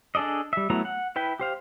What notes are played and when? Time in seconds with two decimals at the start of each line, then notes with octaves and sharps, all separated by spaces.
0.15 D4 G#4 A4 D5 D#5
0.53 G3 E5
0.70 F#3 A3 B3 E4 A#5
0.85 F#5
1.16 E4 B4 G5
1.40 G4 C5 F5